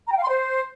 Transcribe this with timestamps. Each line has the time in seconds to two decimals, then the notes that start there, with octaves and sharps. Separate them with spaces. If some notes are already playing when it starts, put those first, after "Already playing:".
0.07 A#5
0.12 G5
0.17 F5
0.22 C6
0.28 C5